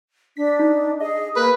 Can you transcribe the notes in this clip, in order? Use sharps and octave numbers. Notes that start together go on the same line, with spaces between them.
D4 B6
D#4
G#4 D#5
A#3 A#4 B4